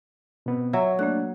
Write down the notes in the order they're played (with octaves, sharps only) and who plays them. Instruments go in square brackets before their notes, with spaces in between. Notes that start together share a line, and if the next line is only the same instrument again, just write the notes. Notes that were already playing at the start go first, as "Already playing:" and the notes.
[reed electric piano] B2 B3 C4
[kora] F#3 [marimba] C#5 [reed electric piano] E5
[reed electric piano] A3 D4 [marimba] A#3 F#6